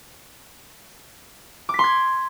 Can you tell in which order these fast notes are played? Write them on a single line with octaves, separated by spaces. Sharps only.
D6 B6 C6 G#6